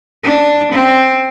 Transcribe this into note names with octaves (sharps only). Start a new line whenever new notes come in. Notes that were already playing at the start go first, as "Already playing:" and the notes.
D4
C4